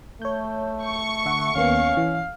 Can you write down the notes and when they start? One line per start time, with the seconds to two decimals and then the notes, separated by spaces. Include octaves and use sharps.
0.22 A3 C#5 G6
0.84 C#6
1.26 D3 E5 F#5
1.56 D#2 A#3 B3 C#4 F5
1.97 E3